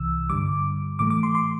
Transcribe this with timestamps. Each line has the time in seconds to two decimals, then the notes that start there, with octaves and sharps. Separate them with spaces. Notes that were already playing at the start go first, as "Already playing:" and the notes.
Already playing: C2 C3 E3 E6
0.29 G2 D3 G3 D6
0.99 A2 E3 A3 D6
1.10 D6
1.23 C6
1.35 C6